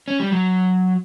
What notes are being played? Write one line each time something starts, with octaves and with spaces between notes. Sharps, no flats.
C#4
G3
F#3